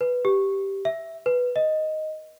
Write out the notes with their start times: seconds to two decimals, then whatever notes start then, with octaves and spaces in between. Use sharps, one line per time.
0.01 B4
0.25 G4
0.85 E5
1.26 B4
1.56 D#5